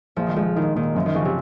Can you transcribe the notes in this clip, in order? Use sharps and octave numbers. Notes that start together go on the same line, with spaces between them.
A#1 F3
D#3
F3 G#3
D#3 D#4
A#2 D#3
F#2 F3
D#3
C#3 F3
C3